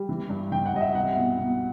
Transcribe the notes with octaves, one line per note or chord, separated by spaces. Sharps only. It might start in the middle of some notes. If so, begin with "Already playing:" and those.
Already playing: G3
E3
G2
E3 G5
F#5
G2 D#5
E5
C2 F#5
B2
B2